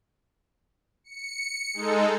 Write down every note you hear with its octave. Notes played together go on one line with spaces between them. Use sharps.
C#7
G#3 D#4 A4